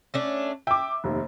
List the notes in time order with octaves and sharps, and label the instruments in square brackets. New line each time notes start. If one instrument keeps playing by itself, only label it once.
[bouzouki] A3 C#4 D4
[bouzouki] E5 [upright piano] G5 D6
[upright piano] F1 D#2